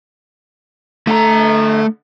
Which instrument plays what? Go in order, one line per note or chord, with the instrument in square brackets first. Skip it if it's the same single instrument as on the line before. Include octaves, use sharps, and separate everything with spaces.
[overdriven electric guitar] D3 A#5 [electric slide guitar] A3 A4